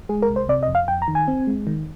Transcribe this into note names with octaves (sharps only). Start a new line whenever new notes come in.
G#3 G#4
A#4
C2
C5
C3 D5
D#5
F2
F5
F2 G5
A#5
D#3
G#5
C4
G#3
D#3